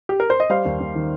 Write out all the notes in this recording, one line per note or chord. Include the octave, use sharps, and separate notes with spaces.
G4
A#4
C5
D#5
G3 C5 F5
D#2
D#2
D#3